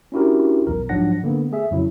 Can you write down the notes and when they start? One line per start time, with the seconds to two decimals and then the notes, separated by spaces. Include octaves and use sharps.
0.12 C#4 D4 E4 F#4 G4 A#4
0.67 B1 E2 A#4
0.89 G#2 F3 F#3 D4 F#5 A#6
1.23 D3 A#3 B3
1.52 A3 G#4 E5
1.71 F2 C#3 F#3 E4